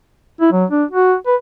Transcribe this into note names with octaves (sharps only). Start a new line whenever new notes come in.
E4
F#3
D4
F#4
B4